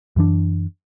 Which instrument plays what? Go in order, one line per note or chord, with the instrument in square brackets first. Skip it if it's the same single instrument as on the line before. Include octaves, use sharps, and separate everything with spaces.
[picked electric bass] F#2 E3 D4